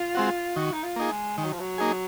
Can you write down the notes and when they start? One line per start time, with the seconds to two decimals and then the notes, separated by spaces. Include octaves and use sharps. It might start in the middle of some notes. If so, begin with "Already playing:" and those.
Already playing: F4
0.15 G#3 C4 F#4
0.56 D#3 F#4
0.73 D#4
0.83 F4
0.96 A#3 D#4 G#4
1.10 G#3
1.37 D#3 G#3
1.45 F#3
1.53 F3
1.60 F#3
1.78 A#3 D#4 G#4